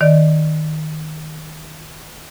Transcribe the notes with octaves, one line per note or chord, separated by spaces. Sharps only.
D#3 D5 D#5